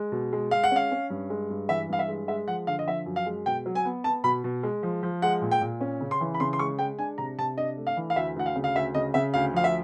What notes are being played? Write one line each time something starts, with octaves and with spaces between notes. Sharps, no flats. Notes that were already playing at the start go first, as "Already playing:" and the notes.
Already playing: G#3
B2
G#3
G#3 F5
F#5
C#4 F5
C#4
G2
G#3
G2
E3 E5
G2 F5
E5
G#3
G#3 E5
F3 F#5
D3 F5
D#5
F3 E5
F#2
F5
G#3
B2 G5
F#3
G#5
B3
B3 A5
B2 B5
B2
G#3
F3
F3
G#3 F#5
A#2
G5
A#2
C#4
C#3
C6
E3
B5
C#3 C6
C6
G#3 C#6
G#3 G5
D4 G#5
C3 A#5
C3 A5
D4 D#5
A3
F5
E3
F5
D2 E5
D2 F#5
F5
C#3
F5
D2 E5
C#3 D#5
C#3 E5
D2 F5
F3 F5
E5